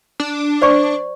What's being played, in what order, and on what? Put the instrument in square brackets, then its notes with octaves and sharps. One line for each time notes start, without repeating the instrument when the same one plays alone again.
[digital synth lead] D4
[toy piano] C5 D5 C#6